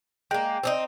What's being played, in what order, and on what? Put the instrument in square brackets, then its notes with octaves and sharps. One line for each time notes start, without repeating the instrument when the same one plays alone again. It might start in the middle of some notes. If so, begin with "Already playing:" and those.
[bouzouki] G#3 A#3 [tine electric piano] G5
[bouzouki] C4 D4 D#4